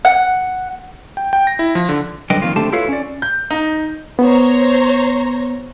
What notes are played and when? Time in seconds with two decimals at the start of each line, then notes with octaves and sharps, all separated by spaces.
0.05 F#5
1.17 G5
1.33 G5
1.47 A#6
1.59 E4
1.75 F3
1.89 D3
2.30 F#2 D3 G3 B4 D#5 G5
2.42 F2 D#3 A#3 F4
2.56 D3 A3 G4 C5 A5
2.73 E4 F4 A4 B4 C#5 F5
2.89 C#4 D5
3.22 G6
3.51 D#4
4.19 B3 C5 C#5 A#5